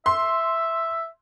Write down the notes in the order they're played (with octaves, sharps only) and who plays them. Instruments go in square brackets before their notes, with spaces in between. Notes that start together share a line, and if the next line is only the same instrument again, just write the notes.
[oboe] E5 [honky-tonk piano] C6